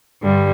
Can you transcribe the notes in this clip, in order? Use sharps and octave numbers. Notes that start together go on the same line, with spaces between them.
G2 D3 G3